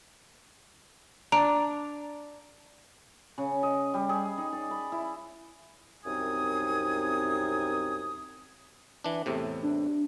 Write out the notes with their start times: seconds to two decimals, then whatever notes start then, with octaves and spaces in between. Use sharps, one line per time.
1.32 D4 A#5 D7 F7
3.38 C#3
3.63 D#5
3.94 G3
4.09 G#4
4.38 D#4
4.53 D5
4.71 B5
4.92 E4
6.05 C2 F#2 C4 D#4 G#5 D#6
9.04 E3 D4
9.26 E2 A2 C3
9.63 D4